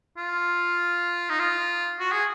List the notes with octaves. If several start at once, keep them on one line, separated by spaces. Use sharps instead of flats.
F4
D#4
F4
F#4
G#4